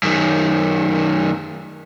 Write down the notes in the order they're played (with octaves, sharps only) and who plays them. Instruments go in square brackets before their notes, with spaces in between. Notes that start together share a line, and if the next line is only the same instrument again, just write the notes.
[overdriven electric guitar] F#2 D#3